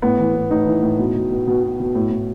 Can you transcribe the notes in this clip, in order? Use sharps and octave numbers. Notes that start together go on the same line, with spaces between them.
A2 B3
E3
A2
A2 D#4
E3
A2
B2
B2
B2
B2
B2
B2
A2
A2